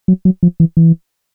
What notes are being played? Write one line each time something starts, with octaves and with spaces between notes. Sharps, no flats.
F#3
F#3
F3
E3
E3